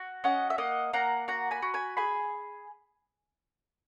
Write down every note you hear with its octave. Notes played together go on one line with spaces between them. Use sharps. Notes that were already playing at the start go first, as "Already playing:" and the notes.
Already playing: F#4
C#4 D#5 F#5
E5
A#3 D#5 F#5
A#3 F#5 A#5
F#4 F#5 A#5
G#5 B5
F#4
G#5 B5
G#4 G#5 B5